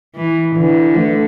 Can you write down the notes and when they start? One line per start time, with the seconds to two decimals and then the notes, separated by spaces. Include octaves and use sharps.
0.15 E3
0.55 D3 E3
0.97 A3